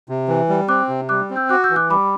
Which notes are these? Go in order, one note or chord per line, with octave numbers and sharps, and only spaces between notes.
C3
E3
G3
C4 D6 F#6
C3
G3 D6 F#6
C4
E6 G6
F#4 D6 F#6
E6 G6
E3
D6 F#6
G3 B5 D6